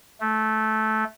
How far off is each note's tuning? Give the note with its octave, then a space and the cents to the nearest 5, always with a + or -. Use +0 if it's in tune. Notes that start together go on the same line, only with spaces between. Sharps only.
A3 -15